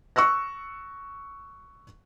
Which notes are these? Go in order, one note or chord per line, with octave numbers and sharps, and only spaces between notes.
C#6 E6 F#6 A#6